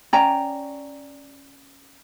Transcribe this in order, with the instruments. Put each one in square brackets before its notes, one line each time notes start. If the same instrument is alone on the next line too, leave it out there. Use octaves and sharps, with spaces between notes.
[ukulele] C#4 D5 G5 A#5